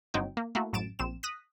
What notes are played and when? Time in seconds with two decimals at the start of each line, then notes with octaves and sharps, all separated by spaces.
0.14 G1 F#3 C4 D#4 G5
0.37 A#3
0.55 A3 A#3 E4 F#4
0.73 A1 F#2 A6 D7 E7
0.99 A#1 C4 E7
1.23 D#6 F#6 A#6 B6